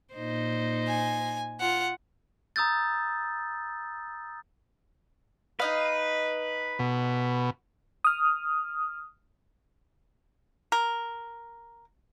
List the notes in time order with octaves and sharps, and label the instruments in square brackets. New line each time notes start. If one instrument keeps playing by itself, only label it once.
[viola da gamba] A#2 D#4 C5
[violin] G#5
F4 F#5
[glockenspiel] A#5 D#6 E6 G6 A6
[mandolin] D#4 D#5 F5 [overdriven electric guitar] B4
[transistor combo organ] B2
[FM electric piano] D#6 F6
[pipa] A#4